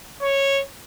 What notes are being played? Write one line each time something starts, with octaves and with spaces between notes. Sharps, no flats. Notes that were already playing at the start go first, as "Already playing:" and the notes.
C#5